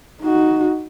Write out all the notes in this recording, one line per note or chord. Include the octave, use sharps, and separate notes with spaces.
D#4 F#4